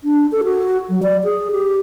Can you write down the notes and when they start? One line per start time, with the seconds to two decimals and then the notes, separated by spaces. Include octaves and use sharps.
0.04 D4
0.32 A4
0.44 F#4
0.89 F#3
1.03 D5
1.24 G#4
1.52 G4